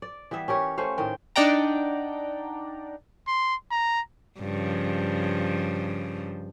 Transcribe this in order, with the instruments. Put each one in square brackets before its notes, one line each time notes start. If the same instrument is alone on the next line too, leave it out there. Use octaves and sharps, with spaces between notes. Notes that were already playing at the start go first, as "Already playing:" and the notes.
[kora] D5
E3 G3 B3 E5
C#4 G4 A#4 C#5
A3 C#4 C5 F5
A2 D#3 A#4 G5
[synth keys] D4 D#4 D5 F#5 G5 A#5
[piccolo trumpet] C6
A#5
[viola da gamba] G2 C#3 F3